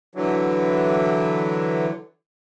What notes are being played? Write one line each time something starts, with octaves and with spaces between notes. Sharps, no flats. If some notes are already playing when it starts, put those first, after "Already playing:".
D3 E3 F#3